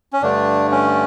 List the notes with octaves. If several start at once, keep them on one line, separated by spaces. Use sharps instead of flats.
C#4
G2 D3 A3 D4
C#4